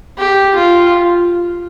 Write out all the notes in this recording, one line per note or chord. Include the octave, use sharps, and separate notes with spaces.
G4
F4